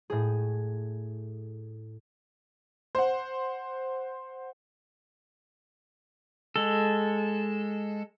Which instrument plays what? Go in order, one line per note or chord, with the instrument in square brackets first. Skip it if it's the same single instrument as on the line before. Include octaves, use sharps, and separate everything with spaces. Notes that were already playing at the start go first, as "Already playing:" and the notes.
[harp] A2 G#4
[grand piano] C5 F#5
[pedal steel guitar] G#3 A4